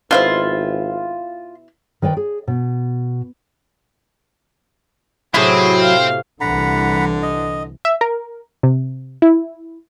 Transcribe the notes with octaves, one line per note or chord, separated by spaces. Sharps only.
G#1 B2 E4 F4 C5
D#3 B4 D5 G5
G#4
B2
A2 C3 F#3 C4 E4 F#4 G#4
F5
C2 D3 E3 F#5 A#5 B5
D#5
E5
A#4
C3
E4